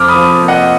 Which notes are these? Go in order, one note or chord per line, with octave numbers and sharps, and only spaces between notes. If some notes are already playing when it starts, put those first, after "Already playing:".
Already playing: F2 D6 F6
B5 D#6
F3
A#3
D#5 F#5